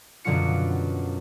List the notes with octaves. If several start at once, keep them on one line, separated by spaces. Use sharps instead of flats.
F#2 B2 D3 F#3 F4 C#7